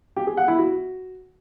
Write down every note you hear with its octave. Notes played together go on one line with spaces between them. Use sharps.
G4
G#4
F#5
E4
F#4